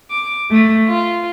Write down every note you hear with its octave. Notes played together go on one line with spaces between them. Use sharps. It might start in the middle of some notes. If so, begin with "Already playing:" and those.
D6
A3
F4